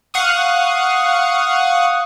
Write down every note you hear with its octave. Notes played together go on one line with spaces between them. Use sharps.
F5 F#5 C#6 D#6